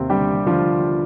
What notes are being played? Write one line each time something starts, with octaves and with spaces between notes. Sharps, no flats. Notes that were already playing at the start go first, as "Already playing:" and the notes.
Already playing: D#2 C3 C4
D3 G3 G4
D3 F3 F4